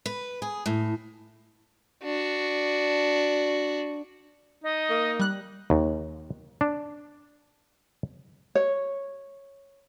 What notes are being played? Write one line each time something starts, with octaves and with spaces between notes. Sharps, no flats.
B4
G#4
A2
D4 F#4
D#4 D#5
A#3
G3 F#6
D#2
D4
C#5